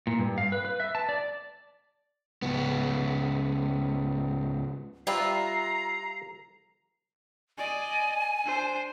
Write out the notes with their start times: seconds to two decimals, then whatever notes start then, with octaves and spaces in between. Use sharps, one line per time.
0.07 A#2
0.19 G2
0.38 F5
0.52 B4
0.65 B4
0.80 E5
0.95 A5
1.09 D5
2.42 C#2 B3
5.07 G3 F4 B4 E5 A#5 C7
7.58 D5 D#5 G#5
8.45 D4 C5